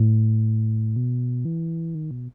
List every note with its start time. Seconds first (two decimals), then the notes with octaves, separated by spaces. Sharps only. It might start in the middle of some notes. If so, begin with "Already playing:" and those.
Already playing: A2
0.96 B2
1.45 E3
1.95 D#3
2.11 B2